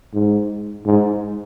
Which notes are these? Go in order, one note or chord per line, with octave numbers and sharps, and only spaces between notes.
G#2
G#2